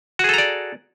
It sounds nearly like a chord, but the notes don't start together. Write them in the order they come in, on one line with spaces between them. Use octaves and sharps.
F#4 G#4 A4 A#5 D5